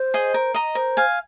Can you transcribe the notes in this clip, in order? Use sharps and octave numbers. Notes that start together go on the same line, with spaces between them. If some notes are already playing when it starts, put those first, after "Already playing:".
Already playing: C5
G#4 D#5
A#4
D#5 A#5 D#6
A#4 C5
F5 G#5